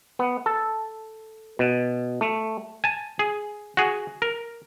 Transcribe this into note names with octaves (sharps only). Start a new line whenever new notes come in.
B3
A4
B2
A3
G#5 A5
G#4
F#4 G#4
A#4